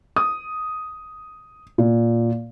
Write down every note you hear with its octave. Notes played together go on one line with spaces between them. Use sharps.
D#6
A#2